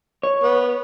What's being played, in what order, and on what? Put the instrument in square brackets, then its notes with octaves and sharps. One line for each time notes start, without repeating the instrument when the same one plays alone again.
[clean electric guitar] C#5
[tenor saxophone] B3